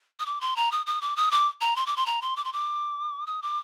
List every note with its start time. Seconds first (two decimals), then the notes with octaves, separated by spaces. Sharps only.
0.19 D#6
0.26 D6
0.41 C6
0.56 A#5
0.72 D#6
0.86 D#6
1.01 D6
1.16 D#6
1.31 D6
1.61 A#5
1.76 C6
1.86 D6
1.97 C6
2.06 A#5
2.22 C6
2.36 D6
2.45 C6
2.53 D6
3.27 D#6
3.42 D6